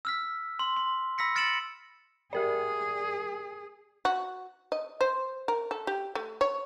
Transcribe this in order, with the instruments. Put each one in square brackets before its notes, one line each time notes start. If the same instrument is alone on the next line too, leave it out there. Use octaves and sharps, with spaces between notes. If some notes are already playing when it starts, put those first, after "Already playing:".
[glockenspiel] E6 F6 B6
C6
C6
B5 E6 A#6 B6 C#7
F6 A6 C#7 D7 E7 F#7
[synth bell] G4 A#4 D5 [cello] G#4
[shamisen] F#4
D#5
C5
A#4
A4
G4
A3
C#5